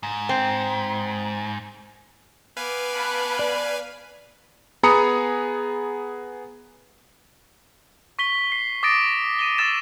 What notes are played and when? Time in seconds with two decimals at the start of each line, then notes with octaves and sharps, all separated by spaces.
0.03 G#2
0.29 C4
2.57 B3 B4 F5 G#5 D6
2.93 A5 B5 F#6
3.39 D5
4.83 B3 G#4 A#5 B5 D#6 C#7
8.19 C#6 B6 G7
8.52 C7
8.83 D6 D#6 A6 A#6 D7
9.39 D#7 E7 G7
9.58 D6 E6 A6 E7